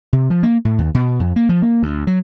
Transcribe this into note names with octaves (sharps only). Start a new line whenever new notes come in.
C3
F3
A#3
A2
D#2
B2
F2
A#3
F3
A#3
D2
F#3